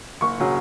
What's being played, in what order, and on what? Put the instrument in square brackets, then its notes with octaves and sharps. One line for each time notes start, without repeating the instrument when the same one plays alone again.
[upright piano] F#1 C#6
C#3 F#3